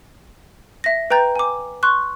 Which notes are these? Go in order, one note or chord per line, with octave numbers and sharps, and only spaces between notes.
E5 A#6
B4 G5 A#5 G6 A6
G#5 D6
C6 C#6 F#6